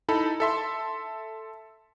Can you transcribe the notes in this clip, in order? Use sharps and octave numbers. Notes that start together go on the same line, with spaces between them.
D#4 E4 A4 B5
A4 E5 C6